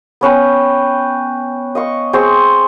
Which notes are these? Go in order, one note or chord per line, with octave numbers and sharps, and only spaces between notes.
B3 C#4 B4 G5
D#5 F5 C#6
C4 G#4 C6 C#6